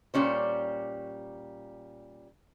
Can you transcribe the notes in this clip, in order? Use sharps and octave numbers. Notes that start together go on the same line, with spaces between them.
A#2 G3 C#4 C5